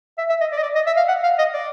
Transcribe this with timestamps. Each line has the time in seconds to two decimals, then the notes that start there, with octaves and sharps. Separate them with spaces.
0.18 E5
0.30 E5
0.41 D#5
0.52 D5
0.58 D#5
0.63 D5
0.75 D#5
0.86 E5
0.97 F5
1.08 F#5
1.24 F5
1.39 D#5
1.54 D5